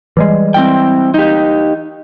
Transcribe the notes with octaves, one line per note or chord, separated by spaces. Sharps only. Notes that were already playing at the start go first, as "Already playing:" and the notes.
E3 G3 G#3
C4 E4 G5
D#4 G4